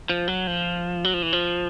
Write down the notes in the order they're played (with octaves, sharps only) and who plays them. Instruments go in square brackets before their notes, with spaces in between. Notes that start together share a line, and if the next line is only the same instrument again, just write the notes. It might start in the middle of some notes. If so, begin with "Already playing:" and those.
[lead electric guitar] F3
F#3
F3
F#3
F3
E3
F3